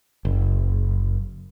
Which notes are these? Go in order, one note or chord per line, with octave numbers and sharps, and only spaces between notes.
F#1